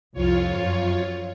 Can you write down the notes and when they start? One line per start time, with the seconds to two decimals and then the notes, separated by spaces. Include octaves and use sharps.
0.13 C2 F2 F4 C#5
0.56 F#2